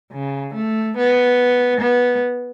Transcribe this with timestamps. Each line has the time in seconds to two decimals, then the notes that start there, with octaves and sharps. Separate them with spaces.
0.12 C#3
0.55 A3
0.97 B3
1.81 B3